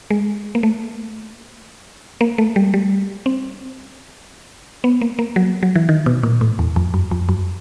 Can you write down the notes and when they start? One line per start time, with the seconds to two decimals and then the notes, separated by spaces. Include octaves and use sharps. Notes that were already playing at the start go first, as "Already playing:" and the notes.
0.10 G#3
0.55 A#3
0.63 A3
2.21 A#3
2.38 A3
2.56 G3
2.74 G3
3.26 C4
4.84 B3
5.01 A#3
5.19 A#3
5.36 F#3
5.63 F#3
5.76 E3
5.89 D#3
6.06 B2
6.23 A#2
6.41 A2
6.59 E2
6.76 F2
6.94 F#2
7.11 F2
7.29 F#2